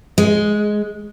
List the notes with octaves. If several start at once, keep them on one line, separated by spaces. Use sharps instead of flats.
G#3